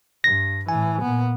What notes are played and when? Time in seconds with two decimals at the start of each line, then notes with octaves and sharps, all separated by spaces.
0.24 G2 A#6
0.69 A2 E3 G#5
1.02 A#2 B3